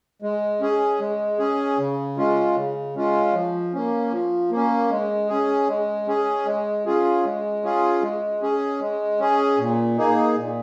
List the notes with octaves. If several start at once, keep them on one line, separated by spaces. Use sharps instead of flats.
G#3
C#4 G#4
G#3
C#4 G#4
C#3
G#3 C#4 F4
C#3
G#3 C#4 F4
F3
A#3 C#4
F3
A#3
C#4
G#3
C#4 G#4
G#3
C#4 G#4
G#3
C#4 F4 G#4
G#3
C#4 F4 G#4
G#3
C#4 G#4
G#3
C#4 G#4
A#2
A#3 D#4 G#4
A#2